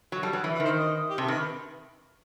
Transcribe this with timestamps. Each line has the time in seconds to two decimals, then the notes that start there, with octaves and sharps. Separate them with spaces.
0.12 F#3 F#4
0.23 G3 A4
0.33 F#3 B4
0.44 E3 B4
0.55 B4
0.60 D#3 C5
0.75 D#5
1.09 G4
1.18 C3 A4
1.28 D#3 B4